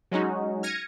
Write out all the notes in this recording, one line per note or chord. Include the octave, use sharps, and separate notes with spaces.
F#3 G#3 C#4 D#4 F#4
F6 G#6 A#6 C#7 D#7